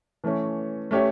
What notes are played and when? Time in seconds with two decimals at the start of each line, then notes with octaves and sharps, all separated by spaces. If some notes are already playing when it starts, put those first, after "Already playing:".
0.24 E3 A3 C#4
0.91 A3 C#4 G4 C#5